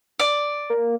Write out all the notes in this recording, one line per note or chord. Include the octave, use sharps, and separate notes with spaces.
D5
A#3